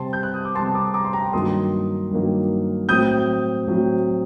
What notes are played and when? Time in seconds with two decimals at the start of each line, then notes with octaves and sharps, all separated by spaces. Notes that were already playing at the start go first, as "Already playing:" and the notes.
Already playing: C3 G3 C4 A5 C6
0.13 G6
0.23 F#6
0.34 D#6
0.45 D6
0.55 C3 G3 C4 A5 C6
0.74 A#5 D6
0.94 A#5 D6
1.05 C6
1.13 G5 A#5
1.33 G2 D#3 F#3 A#3 C6 D#6
2.11 G2 D#3 F#3 A#3
2.88 A2 F#3 C4 D#6 G6
3.67 A2 F#3 C4